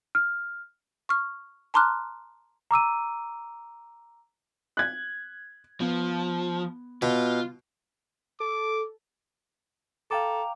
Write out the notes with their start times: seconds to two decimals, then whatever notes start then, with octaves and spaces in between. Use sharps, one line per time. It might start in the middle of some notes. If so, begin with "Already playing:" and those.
0.15 F6
1.09 C#6 F6
1.74 A5 A#5 C6 D6 F6 F#6
2.71 A#5 D6 E6 D#7
4.77 F#6 G#6
5.80 F3 B3
7.02 B2 F4
8.40 A4 D6
10.11 A4 F5 G5 A#5 D6